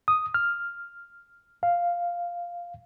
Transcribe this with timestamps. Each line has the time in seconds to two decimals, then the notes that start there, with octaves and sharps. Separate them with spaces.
0.08 D#6
0.34 F6
1.63 F5